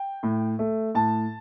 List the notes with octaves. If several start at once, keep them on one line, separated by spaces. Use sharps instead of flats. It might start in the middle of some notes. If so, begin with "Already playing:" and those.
Already playing: G5
A2
A3
A2 A5